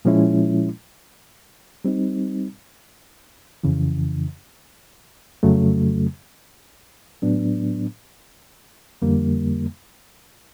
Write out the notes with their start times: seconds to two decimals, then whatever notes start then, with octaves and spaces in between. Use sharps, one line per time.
0.05 A#2 F3 G#3 C#4 E4
1.85 G3 C4 D#4
3.64 F2 C#3 E3
5.43 F2 C#3 F#3 A3
7.22 A2 F#3 B3 D4
9.02 F2 D3 G3 A#3